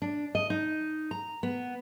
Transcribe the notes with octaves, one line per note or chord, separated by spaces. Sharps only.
D4
D#5
D#4
A#5
B3